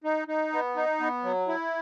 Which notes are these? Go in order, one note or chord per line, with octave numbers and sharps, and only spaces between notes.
D#4
D#4
B3
D#4
B3
F#3
E4